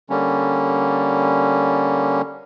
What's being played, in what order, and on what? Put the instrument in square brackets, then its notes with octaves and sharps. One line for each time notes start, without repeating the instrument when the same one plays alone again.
[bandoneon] D3 G3 A#3 C#4